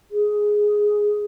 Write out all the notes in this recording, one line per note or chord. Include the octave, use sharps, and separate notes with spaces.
G#4